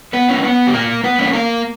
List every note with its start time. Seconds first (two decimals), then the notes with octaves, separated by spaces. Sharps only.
0.13 B3 B4
0.29 A#3 C#4
0.43 B3 B4
0.67 G4
0.73 A#2 A#3 A#4
1.04 B3 B4
1.18 A#3 C#4
1.33 A#3 A#4